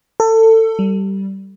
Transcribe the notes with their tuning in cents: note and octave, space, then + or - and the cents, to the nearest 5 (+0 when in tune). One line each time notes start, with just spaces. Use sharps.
A4 +25
G3 -15